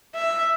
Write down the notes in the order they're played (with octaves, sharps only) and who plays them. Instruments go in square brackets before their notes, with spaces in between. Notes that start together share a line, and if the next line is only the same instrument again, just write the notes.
[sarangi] E5